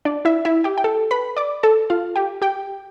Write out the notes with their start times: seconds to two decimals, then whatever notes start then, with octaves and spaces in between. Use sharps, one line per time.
0.05 D4 D5
0.25 E4 E5
0.45 E4 E5
0.64 G4 G5
0.78 G5
0.84 A4 A5
1.11 B4 B5
1.37 D5 D6
1.63 A4 A5
1.90 F4 F5
2.16 G4 G5
2.42 G4 G5